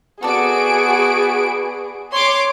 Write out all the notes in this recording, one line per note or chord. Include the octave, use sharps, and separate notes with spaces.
B3 F#4 G#4 A4 D5 D7
C#5 C6 D6